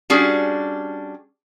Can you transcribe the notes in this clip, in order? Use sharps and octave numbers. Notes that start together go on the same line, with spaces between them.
G3 C#4 D4 F#4 G#4